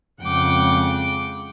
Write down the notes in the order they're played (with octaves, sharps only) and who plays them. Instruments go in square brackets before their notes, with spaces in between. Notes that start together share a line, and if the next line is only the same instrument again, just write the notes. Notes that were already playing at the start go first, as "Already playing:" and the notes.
[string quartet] F2 C#3 G#3 F#5 G5 D6